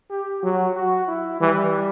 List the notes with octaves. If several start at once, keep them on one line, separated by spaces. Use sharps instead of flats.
G4
F#3 F#4
F#4
E4
E3 G3